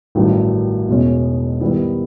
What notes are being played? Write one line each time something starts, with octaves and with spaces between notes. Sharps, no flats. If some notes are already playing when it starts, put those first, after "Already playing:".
A1 G2 D#3 F#3 A3
E1 E2 B2 G#3 C#4
G#2 D#3 G3 B3 E4